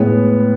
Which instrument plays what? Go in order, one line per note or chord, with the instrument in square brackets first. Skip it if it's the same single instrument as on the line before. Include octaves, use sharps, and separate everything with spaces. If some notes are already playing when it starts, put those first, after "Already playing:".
Already playing: [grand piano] A2 G#3 B3